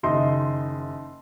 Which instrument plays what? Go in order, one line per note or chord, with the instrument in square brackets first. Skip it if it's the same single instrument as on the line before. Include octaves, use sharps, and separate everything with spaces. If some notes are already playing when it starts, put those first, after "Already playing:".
[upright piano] F#1 D#3 D#4 D#5 E5 C6